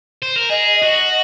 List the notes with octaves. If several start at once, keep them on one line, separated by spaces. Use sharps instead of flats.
C5
A#4
G#4 D#5
F#4 D#5